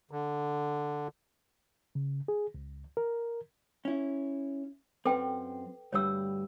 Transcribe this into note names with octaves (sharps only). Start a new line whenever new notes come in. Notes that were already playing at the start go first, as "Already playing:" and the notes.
D3
C#3
G#4
C#2
A#4
C#4 E4
F#2 C4 A4 B4 G5
D2 G2 G3 C#5 E6